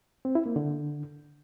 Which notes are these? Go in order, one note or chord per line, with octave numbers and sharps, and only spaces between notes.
C4
E4
A#3
D3